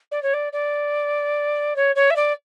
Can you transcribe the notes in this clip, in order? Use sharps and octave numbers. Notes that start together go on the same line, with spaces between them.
D5
C#5
D5
D5
C#5
C#5
E5
D5